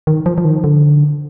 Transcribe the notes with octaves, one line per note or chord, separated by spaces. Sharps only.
D#3
F3
F3
D#3
D3